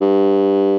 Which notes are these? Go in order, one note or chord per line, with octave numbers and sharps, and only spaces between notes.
G2